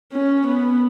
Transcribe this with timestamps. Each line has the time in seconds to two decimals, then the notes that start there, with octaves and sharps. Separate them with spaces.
0.13 C#4
0.48 B3